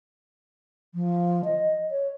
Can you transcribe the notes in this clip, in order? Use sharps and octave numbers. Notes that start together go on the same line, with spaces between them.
F3
D#5
C#5